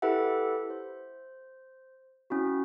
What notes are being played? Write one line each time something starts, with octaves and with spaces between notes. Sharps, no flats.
E4 G4 A4 B4 E5 F#5
C5
C4 C#4 E4 F#4